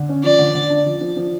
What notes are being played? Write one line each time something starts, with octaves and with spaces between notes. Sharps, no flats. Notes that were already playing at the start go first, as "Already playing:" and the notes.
Already playing: D3
C#4
F3 D5
D3
D3
D4
F3
F3
F3